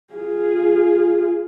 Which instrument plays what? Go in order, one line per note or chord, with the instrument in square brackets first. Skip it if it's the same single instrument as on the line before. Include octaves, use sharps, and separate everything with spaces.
[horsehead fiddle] F4 G#4